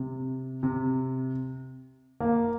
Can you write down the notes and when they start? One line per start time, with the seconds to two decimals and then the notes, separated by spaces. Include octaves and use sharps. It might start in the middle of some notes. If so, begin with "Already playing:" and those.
Already playing: C3
0.63 C3
2.20 A#3